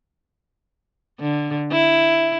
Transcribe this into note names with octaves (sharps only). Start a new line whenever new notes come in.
D3
E4